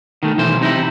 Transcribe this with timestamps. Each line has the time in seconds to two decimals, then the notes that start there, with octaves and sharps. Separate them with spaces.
0.23 D#3 A3
0.37 B1 E3 C5
0.61 C3 D#4 E4